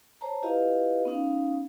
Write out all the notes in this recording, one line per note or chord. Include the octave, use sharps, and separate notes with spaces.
C5 C#5 A5 A#5
E4 F4 G4 B4 D#5 F5
B3 C#4 D#4 F5